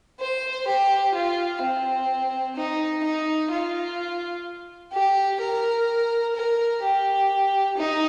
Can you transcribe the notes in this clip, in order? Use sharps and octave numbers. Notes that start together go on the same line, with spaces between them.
C5
G4
F4
C4
D#4
D#4
F4
G4
A#4
A#4
G4
D#4